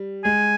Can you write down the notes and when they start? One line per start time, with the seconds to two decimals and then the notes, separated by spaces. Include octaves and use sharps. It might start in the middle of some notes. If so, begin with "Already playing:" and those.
Already playing: G3
0.24 G#3 G#5